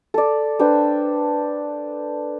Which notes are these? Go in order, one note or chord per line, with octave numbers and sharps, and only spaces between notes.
A4 D5
D4 B4 C5 G5